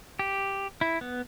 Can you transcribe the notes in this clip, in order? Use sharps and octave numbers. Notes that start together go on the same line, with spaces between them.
G4
E4
B3